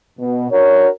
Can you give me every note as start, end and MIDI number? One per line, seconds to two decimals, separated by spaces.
0.18 0.48 47
0.50 0.88 62
0.50 0.88 66
0.50 0.88 70
0.50 0.88 73